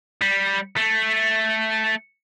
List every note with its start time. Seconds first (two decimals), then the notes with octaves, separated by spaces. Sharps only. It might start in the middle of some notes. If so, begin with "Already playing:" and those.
0.21 G3
0.77 A3